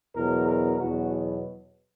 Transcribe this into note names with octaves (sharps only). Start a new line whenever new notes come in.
E2 B2 F#3 A#4
A#4
E2 B2 F#3 F#4